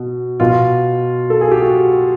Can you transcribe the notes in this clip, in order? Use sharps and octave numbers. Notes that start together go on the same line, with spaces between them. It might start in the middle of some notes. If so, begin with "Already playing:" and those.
Already playing: B2
B2 F4
A4
G#4
G4
F#4